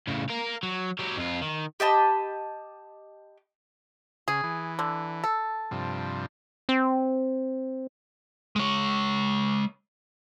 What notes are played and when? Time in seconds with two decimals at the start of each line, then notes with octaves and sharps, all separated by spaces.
0.08 A2 C#3
0.30 A#4 F5
0.63 F#3
0.99 F#3 G4
1.18 F2 F4
1.42 D#3
1.80 G4 D#5 A5 B5
4.28 C#3 G#4
4.43 E3
4.79 D3
5.24 A4
5.71 G2 C3 F3
6.69 C4
8.56 G#3 C#5